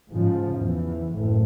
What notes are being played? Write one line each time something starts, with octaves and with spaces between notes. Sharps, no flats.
G#2 C#3 F3
E2 E3
F#1 A2